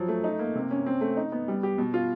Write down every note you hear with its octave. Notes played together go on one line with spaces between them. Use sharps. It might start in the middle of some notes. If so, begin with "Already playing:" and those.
Already playing: F3 F#3
A3
D#4
A#3
C3
C#4
C4
A3
D#4
B3
G3
G4
B2
F4